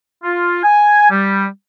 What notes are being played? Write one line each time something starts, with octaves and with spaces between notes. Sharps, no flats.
F4
G#5
G3